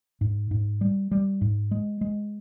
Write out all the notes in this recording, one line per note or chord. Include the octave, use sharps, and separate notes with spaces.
G#2
G#2
G3
G3
G#2
G#3
G#3